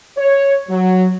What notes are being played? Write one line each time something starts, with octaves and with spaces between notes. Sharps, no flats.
C#5
F#3